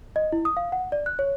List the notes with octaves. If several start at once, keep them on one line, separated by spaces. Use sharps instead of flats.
D#5
E4
D#6
F5
F#5
D5
F#6
C#5